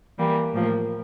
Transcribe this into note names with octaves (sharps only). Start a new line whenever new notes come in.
E3 G3 A#3
A2 F3 A#3